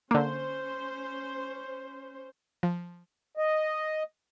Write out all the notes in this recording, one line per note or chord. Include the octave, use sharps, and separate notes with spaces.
D3 A#3 C#4 C5
F3
D#5